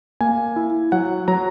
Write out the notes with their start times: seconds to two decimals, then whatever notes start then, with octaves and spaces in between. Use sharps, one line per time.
0.21 A#3 G#5
0.56 E4
0.92 F#3 F#5
1.28 F#3 A#5